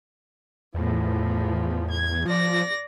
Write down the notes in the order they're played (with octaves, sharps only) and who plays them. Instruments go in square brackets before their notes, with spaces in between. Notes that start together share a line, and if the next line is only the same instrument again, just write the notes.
[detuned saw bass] E2 [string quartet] A2 F3
[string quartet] G#6
[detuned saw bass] F3 [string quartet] D5 A#6